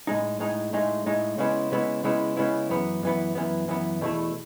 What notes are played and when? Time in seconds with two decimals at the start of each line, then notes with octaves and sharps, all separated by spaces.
0.07 A2 G#3 D#4
0.40 A2 G#3 D#4
0.73 A2 G#3 D#4
1.06 A2 G#3 D#4
1.38 C#3 G#3 B3 E4
1.72 C#3 G#3 B3 E4
2.04 C#3 G#3 B3 E4
2.37 C#3 G#3 B3 E4
2.70 F#2 E3 B3
3.03 F#2 E3 B3
3.35 F#2 E3 B3
3.68 F#2 E3 B3
4.01 E2 B2 A3 E4